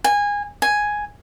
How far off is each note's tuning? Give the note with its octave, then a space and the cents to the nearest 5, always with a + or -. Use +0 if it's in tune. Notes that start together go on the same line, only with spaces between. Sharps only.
G#5 -20
G#5 +5